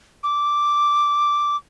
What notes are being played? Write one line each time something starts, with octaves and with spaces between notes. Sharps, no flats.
D6